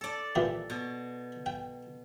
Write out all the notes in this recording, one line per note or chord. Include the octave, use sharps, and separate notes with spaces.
A4 D5
A#2 E3 G4
B2
G5